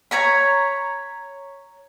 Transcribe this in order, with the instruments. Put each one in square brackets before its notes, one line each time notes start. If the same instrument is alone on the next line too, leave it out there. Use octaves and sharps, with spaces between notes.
[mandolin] C#5 A#5 B5